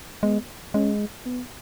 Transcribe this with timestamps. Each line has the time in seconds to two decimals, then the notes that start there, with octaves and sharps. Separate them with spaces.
0.23 G#3 B3
0.74 G#3 C#4
1.26 B3